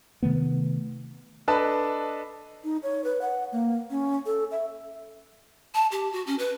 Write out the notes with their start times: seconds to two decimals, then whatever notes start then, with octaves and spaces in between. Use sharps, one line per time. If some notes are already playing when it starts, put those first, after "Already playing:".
0.23 C3 D#3 A3 B3
1.48 D4 A4 B4 D#5 A5
2.64 D#4
2.83 C#5
3.04 B4
3.22 F#5
3.52 A#3
3.90 C#4
4.26 A4
4.52 E5
5.74 A5
5.92 G4
6.12 F#4
6.27 C#4
6.39 B4